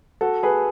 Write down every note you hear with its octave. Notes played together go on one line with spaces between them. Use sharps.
F#4 A4
G#4 B4